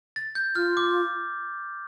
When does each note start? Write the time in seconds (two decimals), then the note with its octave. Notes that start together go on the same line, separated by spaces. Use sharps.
0.16 A6
0.35 G6
0.56 F4 F6
0.77 D6